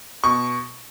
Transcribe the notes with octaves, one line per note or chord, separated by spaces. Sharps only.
B2 C#6